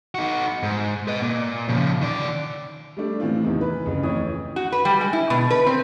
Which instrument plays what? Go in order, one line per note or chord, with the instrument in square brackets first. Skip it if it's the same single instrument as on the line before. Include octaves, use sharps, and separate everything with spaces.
[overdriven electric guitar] D#4 F#4
G#2
B4 D#5
A#2
C#3 F3
D#3 D5
[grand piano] G3 A3 D4 A4
A2 E3 C4 F4
E2 C3 D#3 E3
B4
F2 C#3
F2 A2 E3 E4 C#5 D#6
[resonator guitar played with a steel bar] F#4
B4
G3
G#3
E4
B2
B4
C4